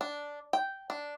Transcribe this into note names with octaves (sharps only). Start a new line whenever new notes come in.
D4
G5
D4